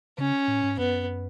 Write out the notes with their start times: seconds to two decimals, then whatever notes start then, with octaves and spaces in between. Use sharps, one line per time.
0.18 C#3 C#4
0.48 A2
0.63 G#2
0.78 F#2 B3